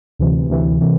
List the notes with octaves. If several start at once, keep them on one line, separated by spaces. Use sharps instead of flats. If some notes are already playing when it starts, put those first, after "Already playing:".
D2 C3 E3
D2 C3 E3
C3 E3